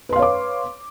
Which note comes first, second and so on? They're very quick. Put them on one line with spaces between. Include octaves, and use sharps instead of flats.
B4 C6 F5 C#5 D6